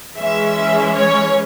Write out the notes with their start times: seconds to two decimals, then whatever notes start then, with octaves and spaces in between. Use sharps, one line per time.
0.17 E3 G#3 C#4 E5
0.95 C#5